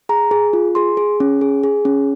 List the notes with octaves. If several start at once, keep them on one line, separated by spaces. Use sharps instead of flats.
G#4 A#5
G#4
F4
G#4 C6
G#4
C#4
G#4
G#4
C#4